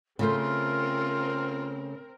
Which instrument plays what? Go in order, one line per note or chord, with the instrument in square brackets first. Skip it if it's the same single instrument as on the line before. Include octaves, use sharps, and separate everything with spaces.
[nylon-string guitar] C#3 A3 C5 [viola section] C4 A#4 [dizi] F4